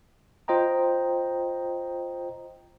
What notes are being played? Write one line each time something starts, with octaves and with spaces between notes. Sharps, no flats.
F4 C5 D#5 G5 A#5